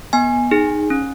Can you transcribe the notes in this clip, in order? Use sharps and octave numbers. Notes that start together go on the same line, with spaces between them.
B3 G#5
D#4 G#4
C#4